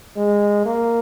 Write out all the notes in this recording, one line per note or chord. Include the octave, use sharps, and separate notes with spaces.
G#3
A#3